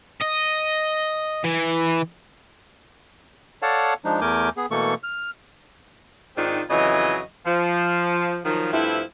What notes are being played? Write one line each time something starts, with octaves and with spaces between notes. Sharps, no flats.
D#5
E3
A4 C#5 D5 F5 F#5 A5
F3 G#3 D4 D#4
E2 A3 A#4 G#5 D6 G6
B3 G#4
B2 E3 A3 A#3 A4 C#6
F6
G#2 D#3 C4 D4 D#4 F4
F2 C#3 E3 F#3 D#5
F3
D#3 F3 F#3
G2 F3 A3 C4 E4